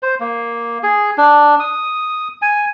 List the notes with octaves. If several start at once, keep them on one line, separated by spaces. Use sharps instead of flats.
C5
A#3
G#4
D4
D#6
G#5